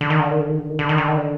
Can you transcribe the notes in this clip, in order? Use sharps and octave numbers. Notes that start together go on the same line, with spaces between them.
D3
D#3
D3
D#3
D3
D#3
D3
D#3
D3
D#3
D3
D#3
D3